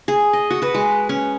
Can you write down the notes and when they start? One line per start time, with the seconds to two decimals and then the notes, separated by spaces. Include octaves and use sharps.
0.08 G#4
0.33 D#5
0.50 F#4
0.62 F#4 B4
0.74 G#3
1.09 C#4